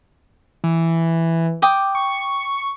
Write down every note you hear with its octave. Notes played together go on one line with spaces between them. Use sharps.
E3
G5 D6 D#6
C#6